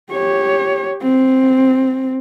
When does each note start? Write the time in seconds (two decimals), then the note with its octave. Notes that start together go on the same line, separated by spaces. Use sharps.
0.12 G4 C#5
1.02 C4